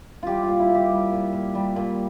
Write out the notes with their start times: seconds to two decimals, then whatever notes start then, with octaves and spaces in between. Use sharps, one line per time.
0.23 G3 F4 G4
0.43 F4
0.48 A#2
0.59 E4
0.70 A#2
0.75 G4
0.91 G3
1.12 A#2
1.33 A#2
1.55 G3
1.76 A#2